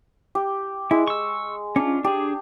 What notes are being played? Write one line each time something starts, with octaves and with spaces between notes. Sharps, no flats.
G4
G#3 E4
C#6 E6
C#4 D4 F4
D4 G4 G#4